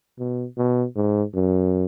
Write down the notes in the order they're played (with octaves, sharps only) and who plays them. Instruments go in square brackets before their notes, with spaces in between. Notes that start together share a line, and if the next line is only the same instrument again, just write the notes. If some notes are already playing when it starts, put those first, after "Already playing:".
[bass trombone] B2
B2
G#2
F#2